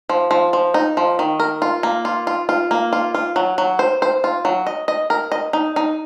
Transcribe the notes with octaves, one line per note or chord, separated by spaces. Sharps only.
F3
F3
F3
D#4
F3
D#3
A#4
F4
A#3
F4
F4
F4
A#3
F4
F4
F#3
F#3
C5
C5
F4
F#3
D#5
D#5
A#4
D#5
D#4
D#4